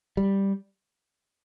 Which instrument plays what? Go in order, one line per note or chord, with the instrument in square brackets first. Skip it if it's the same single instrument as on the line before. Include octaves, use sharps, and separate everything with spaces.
[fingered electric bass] G3